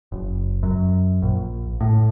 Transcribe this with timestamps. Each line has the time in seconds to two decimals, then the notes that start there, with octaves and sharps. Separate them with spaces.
0.12 F#1
0.63 F#2
1.22 A#1
1.81 A2